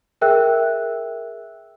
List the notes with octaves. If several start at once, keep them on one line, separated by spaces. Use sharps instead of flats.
G#4 A#4 E5 G5 E6 F#6